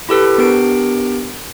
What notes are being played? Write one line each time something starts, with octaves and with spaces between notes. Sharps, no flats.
E4 G4 A4 B4
B3 D4 G4 A#4 D7